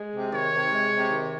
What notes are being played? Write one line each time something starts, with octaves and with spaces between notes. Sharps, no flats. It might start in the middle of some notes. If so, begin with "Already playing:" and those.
Already playing: G#3
C3
D#3 C#5
C3
G#3
C3
D#3